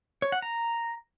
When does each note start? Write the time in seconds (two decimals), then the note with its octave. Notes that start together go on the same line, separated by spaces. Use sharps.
0.22 C#5
0.32 F#5
0.42 A#5